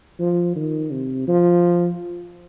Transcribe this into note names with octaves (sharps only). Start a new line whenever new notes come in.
F3
D#3
C3
F3